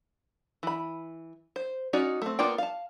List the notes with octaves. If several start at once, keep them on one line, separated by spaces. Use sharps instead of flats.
E3 B5
C5
C#4 D#4 F#4 D5
A3 C4
A#3 B3 F4 D5 G5
F5 A5